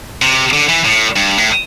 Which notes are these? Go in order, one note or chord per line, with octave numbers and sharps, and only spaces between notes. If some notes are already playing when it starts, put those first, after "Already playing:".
C3
D3
E3
A2
G2
A2